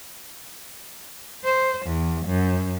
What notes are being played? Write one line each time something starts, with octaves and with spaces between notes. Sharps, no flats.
C5
E2
F#2